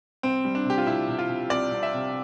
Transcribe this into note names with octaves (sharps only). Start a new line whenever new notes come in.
C2 C4
G3
D4
C3 G4
F4
C3 E4
C3
F4
C3
C2 D5
C2
E5
C3